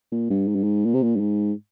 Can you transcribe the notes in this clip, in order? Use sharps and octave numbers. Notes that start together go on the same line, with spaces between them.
A#2
G2
G#2
G2
G#2
A#2
C3
A#2
G2
G#2